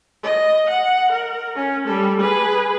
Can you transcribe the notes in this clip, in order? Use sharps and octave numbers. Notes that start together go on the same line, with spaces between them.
D#5
F#5
A#4
C#4
G3 A4
G#4 B4